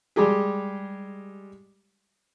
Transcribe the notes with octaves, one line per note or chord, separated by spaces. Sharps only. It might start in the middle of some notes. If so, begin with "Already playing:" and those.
G3 G#3 G4 G#4